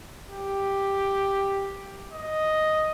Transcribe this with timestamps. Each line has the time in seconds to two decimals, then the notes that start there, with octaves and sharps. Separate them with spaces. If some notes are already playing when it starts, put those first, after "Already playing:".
0.25 G4
2.13 D#5